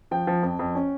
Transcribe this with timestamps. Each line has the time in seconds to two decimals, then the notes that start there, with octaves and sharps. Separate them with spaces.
0.11 F3 G5
0.27 F3
0.43 F2
0.59 F2
0.75 C#4